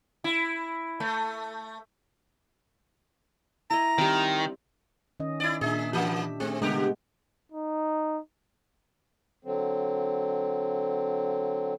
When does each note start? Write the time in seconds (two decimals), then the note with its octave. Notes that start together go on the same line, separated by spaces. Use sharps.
0.24 E4
1.00 A3
3.70 E4 D#5 A#5
3.98 D#3 G3 C4
5.20 D#3 C#4 D#5
5.40 E4 D5
5.61 A#2 D4 G#4 E5
5.93 E3 A#3 D4 G4
6.40 A3 C4 G#4
6.62 C#3 G#3 B3 G4
7.52 D#4
9.45 D3 F#3 C4